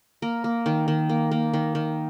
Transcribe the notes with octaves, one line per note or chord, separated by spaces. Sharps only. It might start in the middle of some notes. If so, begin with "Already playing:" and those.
A#3 A#4
A#3
D#3
D#3
A#3
A#3
D#3
D#3